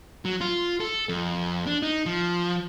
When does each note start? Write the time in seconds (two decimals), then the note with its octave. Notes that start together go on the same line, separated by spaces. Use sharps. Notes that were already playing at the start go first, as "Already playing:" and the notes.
0.25 F#3
0.41 F4
0.80 A4
1.09 F2
1.66 D4
1.83 D#4
2.06 F3